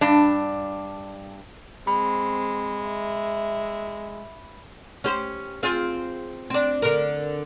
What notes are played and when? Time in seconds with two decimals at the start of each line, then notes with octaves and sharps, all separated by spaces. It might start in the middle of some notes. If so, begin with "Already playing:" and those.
0.01 G2 D4
1.87 G#3 C4 B5
2.86 E5
5.04 C#4 G4 C5
5.63 C4 F4 G#4
6.50 C4 D4
6.82 D3 A#4